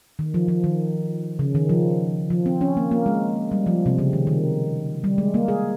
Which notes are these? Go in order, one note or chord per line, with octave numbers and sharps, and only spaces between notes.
D#3
F3
F3
D#3
C#3
D#3
F3
F3
C4
C#4
A#3
A#3
G#3
G3
F3
C3
C#3
D#3
D#3
G3
G#3
A#3
G#4